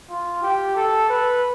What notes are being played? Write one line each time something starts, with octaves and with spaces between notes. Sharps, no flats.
F4
G4
A4
B4